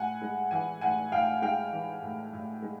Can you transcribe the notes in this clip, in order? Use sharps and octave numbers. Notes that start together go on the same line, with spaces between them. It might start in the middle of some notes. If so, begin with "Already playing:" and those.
Already playing: A2 F#5 G#5
G#3
E3 F#5 G#5
A2 F#5 G#5
A2 F5 G5
G#3 F5 G5
E3
A2
A2
G#3